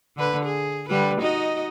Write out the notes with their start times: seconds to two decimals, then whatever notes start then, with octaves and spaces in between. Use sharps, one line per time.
0.16 D3 B4
0.45 G#4
0.89 D3 G3 B4
1.21 D#4 F#4 D#5